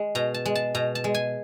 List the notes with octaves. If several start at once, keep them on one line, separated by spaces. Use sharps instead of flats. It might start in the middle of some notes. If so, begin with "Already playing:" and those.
Already playing: G#3
B2 A#5
A5
G#3
A5
B2 A#5
A5
G#3
G#5